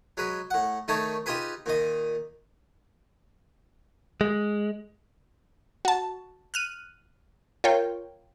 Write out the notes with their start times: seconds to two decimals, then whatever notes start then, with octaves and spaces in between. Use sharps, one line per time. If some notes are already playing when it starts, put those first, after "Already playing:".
0.17 F#3 G#3 B4
0.51 A2 F#5
0.88 D#3 A3 D#4 C#5 A5
1.26 D#4 F4 G4 G#4 B4
1.66 A#2 D#3 D#5
4.21 G#3
5.85 F#4 A5
6.54 F6 F#6 D#7
7.64 F4 A#4 C#5 G5